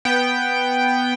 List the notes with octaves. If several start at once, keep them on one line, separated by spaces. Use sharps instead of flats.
B3 G5